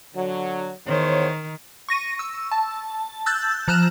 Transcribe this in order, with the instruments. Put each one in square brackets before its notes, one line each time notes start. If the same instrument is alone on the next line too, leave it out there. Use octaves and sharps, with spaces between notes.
[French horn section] D3 F#3
[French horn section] E2 C5 C#5 [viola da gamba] D#3
[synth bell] C#6 A#6 D#7
E6
A5
E6 F#6 G6 A6
F3 A#5 F6 F#6 E7